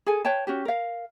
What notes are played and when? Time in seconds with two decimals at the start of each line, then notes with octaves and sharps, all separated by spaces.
0.06 G#4 A4 G#5
0.25 B4 C#5 G5 A5
0.47 C#4 F#4 G4
0.65 A#4 F5